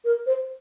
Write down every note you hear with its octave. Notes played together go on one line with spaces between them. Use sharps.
A#4
C5